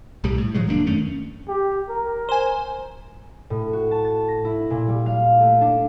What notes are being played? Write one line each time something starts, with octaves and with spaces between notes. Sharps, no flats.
B1 A2 G3
A2
D#3 F3 F#3 G#3
F1 A#3 C4 D4
F#2 D#3 A3 C#4
G4
A#4
C5 G#5
A2
F#4
A5
A6
A#6
E4
A#2
G3
F5
A3
D4